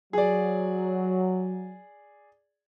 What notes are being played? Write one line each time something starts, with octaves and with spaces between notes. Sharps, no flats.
F#3 G#4 D5